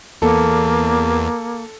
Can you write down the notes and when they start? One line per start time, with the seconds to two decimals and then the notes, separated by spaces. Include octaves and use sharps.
0.22 E2 A#3 A4